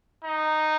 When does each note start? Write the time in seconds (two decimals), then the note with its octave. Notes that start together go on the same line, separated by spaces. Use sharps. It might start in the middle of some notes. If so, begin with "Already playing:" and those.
0.25 D#4